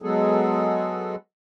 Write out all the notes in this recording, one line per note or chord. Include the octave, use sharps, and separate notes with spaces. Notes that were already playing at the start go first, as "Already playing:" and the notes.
F#3 G#3 B3 G#4 A4